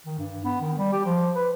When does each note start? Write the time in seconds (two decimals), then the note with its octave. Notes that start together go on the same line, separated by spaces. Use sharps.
0.06 D#3
0.19 G2
0.45 B3
0.61 D#3
0.78 G3
0.93 G4
1.06 F3
1.36 B4